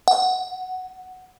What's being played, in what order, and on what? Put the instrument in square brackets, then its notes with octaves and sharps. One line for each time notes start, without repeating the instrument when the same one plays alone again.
[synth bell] F#5